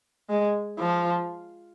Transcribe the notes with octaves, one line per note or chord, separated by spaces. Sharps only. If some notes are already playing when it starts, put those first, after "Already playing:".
G#3
F3